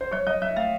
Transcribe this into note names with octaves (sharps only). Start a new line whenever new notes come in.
C5
F#3 C#5
F#3 D#5
F#3 E5
A3 F5